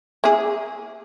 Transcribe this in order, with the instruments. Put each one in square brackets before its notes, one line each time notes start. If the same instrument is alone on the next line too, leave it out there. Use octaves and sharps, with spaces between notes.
[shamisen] A#3 E4 G#4